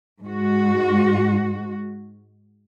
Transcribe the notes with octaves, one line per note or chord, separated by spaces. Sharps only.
G#2 F#4